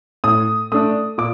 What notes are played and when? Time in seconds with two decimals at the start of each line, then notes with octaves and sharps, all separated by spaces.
0.24 A2 D#6
0.72 A3 D4 D#6
1.18 A#2 D6